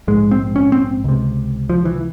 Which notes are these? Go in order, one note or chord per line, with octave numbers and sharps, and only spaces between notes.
A#1 G#2 G#3
C4
C#4
C4
C#2 C3
F3
E3